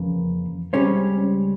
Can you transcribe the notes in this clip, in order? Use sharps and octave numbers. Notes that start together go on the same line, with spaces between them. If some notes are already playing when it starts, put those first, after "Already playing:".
Already playing: F2 C#3 E3 A#3
C#2 C#3 G3 C4 C#4